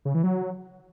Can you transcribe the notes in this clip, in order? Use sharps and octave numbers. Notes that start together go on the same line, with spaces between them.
C#3
E3
F#3